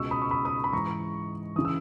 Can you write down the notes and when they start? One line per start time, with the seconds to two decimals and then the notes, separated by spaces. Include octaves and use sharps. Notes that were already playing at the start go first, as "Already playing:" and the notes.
Already playing: C#2 B2 C#6 E6
0.11 B5 D#6
0.22 C#6
0.31 B5 D#6
0.45 B5 D#6
0.64 B5
0.72 G#2 E3 A#5 C#6
1.56 C#3 E3 D#6
1.65 E6